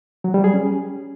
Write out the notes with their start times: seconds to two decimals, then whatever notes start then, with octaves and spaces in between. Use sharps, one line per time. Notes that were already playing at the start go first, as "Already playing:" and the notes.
0.24 F#3
0.34 G3
0.44 G#4
0.54 C#4